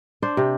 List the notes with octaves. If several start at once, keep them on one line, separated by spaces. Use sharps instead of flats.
D4 C5
C3